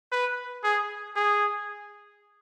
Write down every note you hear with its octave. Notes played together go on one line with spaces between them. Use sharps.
B4
G#4
G#4